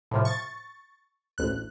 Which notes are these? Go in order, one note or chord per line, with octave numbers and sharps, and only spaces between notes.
A2 C3 F3
C#6 A6
A1 D2 F#6